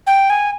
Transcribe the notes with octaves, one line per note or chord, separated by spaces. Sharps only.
G5
G#5